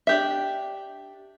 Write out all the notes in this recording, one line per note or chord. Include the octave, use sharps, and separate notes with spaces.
D4 G4 E5